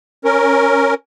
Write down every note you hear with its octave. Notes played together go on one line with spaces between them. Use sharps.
C#4 A#4